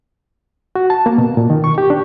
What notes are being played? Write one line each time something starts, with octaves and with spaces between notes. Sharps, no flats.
F#4
A5
A#3
B2
A#2
D#3
C#6
G4
D4